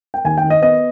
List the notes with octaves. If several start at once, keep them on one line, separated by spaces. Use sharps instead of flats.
G5
D#2 G#5
G5
D#3
D#5
B3 D#5